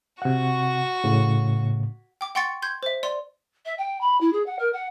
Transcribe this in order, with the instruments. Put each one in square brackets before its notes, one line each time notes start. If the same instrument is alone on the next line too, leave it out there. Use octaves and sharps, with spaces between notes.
[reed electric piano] C3 F#5 [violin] F#4 C#6
[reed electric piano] A2 C#3
[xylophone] G5 D6
F#5 G5 C6 C#6 A6 C#7
C6 G6 G#6
C5 E5
D5 C6
[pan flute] E5
G5
B5
E4
G#4
F#5
A#4
F#5